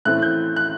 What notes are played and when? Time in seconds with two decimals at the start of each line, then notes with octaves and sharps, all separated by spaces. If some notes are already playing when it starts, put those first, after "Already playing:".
0.05 A2 E3 A3 C4 F#6
0.22 G6
0.56 F#6